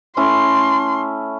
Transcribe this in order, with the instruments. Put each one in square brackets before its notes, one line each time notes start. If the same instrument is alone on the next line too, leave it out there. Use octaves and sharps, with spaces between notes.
[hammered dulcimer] A3 C#4 E4 [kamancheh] C6